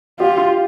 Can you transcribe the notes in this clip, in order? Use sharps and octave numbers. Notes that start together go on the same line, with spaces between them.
F4 G4